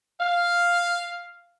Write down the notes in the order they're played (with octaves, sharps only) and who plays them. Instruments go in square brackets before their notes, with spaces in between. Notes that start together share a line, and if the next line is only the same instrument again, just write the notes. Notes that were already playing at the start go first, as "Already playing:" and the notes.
[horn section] F5